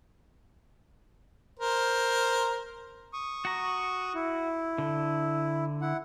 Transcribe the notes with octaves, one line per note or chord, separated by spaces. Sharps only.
A#4 C5
C#6 D#6
F#4 A#5
E4
D3
E4 F#5